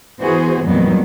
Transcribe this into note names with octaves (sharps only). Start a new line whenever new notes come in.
E3 B3 F#4 G#4 C5
F2 A#2 D#3 F#3 G3 B3